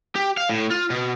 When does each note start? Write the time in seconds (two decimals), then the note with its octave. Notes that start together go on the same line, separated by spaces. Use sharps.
0.15 G4
0.37 F5
0.49 A2
0.70 F4
0.90 B2